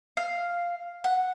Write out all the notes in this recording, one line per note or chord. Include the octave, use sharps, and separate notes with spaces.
F5
F#5